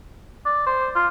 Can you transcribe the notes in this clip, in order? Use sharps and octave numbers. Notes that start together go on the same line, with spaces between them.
D5
C5
F4